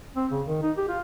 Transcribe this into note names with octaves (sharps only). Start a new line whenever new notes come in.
C4
C#3
D#3
D#4
G4
F4